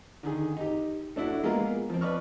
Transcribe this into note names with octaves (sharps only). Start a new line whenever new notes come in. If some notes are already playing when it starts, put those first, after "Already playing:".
D3 D#3 G#4
D#4 G4
A3 D4 E4 F#4
G#3 A#3 B3 F4 A#4
F3 C4
B4 D5 D#5 C#6 F6